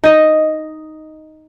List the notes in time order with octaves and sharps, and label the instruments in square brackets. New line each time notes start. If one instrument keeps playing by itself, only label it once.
[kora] D#4 D#5